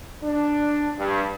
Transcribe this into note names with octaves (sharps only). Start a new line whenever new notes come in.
D4
G2